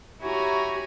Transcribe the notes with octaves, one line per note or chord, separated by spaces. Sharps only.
E4 F#4 G4 C#5 G#5 A#5